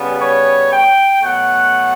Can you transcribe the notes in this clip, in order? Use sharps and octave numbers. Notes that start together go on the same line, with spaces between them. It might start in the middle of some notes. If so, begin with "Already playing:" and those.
Already playing: C#3 G3 B3
C#5
G5
B2 F#3 A3 F#5